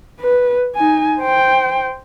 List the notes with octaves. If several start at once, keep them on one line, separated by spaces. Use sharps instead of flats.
B4
D#4 G#5
C5 G5